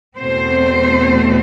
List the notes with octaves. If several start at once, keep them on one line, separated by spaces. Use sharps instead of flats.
E2 B2 A3 C4 C5